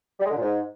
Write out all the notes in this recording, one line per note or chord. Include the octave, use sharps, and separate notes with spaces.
G3
G#3
D3
A#2
G#2